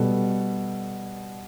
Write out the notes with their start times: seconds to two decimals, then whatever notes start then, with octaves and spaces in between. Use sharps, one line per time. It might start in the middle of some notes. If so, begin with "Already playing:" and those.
Already playing: B2 G3 B3 A4